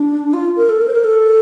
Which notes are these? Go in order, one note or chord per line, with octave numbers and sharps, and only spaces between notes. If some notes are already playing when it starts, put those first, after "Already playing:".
Already playing: D4
F4
A#4
A4
A#4
C5
A#4
A4